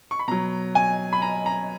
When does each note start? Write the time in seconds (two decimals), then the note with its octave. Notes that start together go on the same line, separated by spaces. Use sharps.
0.11 C#6
0.19 B5
0.28 B2 F#3 A#5
0.75 G#5
1.13 B5
1.22 A#5
1.46 A#5